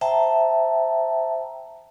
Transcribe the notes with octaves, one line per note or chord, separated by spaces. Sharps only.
C5 E5 G5 A5 A#5